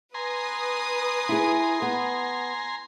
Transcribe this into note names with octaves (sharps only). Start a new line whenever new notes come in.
B4 G#5 A#5 C6 D#6
E4 G#4
B3